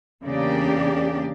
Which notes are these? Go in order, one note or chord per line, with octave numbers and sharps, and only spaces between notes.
E2 C#3 A#3 D4 G4 D5